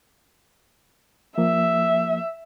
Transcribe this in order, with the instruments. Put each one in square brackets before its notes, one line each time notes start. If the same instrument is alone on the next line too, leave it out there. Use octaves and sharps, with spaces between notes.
[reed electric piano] F3 A#3 [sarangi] E5